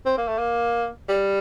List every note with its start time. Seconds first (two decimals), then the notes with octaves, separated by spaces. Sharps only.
0.06 C4
0.17 A#3
0.27 A3
0.38 A#3
1.09 G3